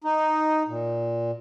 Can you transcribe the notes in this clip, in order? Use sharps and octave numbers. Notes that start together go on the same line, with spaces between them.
D#4
A#2